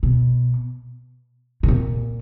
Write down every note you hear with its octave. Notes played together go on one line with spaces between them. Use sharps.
B2
B2
A#2